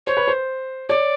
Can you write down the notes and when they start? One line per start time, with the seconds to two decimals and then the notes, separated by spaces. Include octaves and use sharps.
0.07 C5 C#5
0.17 B4
0.27 C5
0.89 C#5 D5